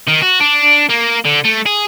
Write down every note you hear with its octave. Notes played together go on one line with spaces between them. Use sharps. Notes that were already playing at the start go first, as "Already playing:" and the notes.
D#3
F#4
D4
A#3
D3
A3
G#4